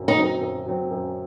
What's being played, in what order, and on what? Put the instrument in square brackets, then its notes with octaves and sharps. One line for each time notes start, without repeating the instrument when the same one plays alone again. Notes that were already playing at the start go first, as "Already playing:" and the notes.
Already playing: [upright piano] F#2 F#3 C4
[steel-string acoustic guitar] D#4
[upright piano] F#3 C4
F#2
F#3 C4
F#2